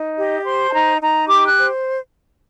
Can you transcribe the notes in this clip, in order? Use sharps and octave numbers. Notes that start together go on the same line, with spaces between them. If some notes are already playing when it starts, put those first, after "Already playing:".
Already playing: D#4
G4 D#5
C5 C6
A5
D#4 A#5
D#4 A#5
G4 D6
F#6
C5